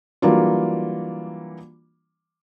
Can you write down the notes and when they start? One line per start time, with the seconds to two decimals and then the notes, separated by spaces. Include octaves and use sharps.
0.22 E3 F#3 G3 A#3 D4 F4